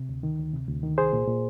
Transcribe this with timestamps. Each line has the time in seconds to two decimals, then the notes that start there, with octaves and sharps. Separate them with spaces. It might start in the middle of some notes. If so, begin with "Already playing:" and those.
Already playing: C3
0.09 D2
0.23 D#3
0.39 D2
0.53 C3
0.68 D2
0.83 D#3
0.98 C2 G#4 C5
1.13 A#2
1.27 A#2